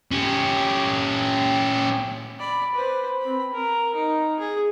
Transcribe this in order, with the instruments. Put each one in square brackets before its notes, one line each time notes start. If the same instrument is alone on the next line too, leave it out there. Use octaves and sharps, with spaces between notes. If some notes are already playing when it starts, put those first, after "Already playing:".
[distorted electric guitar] C#4 G4
[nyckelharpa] D5 B5
B4 C5
C4 B5
A#4
D#4
G#4